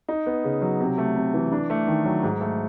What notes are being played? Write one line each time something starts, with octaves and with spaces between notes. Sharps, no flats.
D#4
B3
C#3
F#3
C3
A3
C3
E3
D4
A3
D#3
F#3
G#2
A3